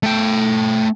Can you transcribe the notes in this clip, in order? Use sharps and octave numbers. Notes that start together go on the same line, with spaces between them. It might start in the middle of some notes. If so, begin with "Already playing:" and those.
A3 G5